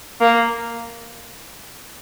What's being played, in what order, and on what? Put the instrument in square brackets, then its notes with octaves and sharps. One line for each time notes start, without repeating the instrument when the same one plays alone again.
[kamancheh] A#3